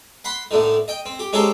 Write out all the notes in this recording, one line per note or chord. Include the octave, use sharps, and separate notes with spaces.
F#5 B5 C6
A2 D3 D#3
D#5 G5
C4
G4
G#3 C#4 D#4 G4 A4 C5